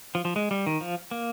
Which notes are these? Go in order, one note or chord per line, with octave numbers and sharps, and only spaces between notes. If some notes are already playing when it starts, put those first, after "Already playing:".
F3
F3
G#3
G3
D#3
F3
A#3